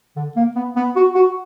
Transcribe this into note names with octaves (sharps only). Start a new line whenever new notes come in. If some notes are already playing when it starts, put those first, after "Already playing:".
D3
A#3
B3
B3
F#4
F#4